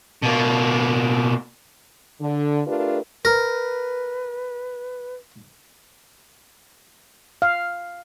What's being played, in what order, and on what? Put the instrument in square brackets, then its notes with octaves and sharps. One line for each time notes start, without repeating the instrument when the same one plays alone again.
[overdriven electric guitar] B2 A#3
[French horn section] D3
A3 D4 F4 G4 A#4 B4
[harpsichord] A#4 [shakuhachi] B4
[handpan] F5